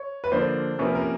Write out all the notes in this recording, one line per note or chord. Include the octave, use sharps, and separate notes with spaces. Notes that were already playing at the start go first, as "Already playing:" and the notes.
Already playing: C#5
B4
D3 F3 A#3 D4 C5
C3 F3 A#3 C#4 B4
A#4